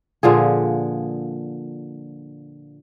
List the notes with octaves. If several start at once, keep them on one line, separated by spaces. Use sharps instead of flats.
A#2 D3 F3 G#4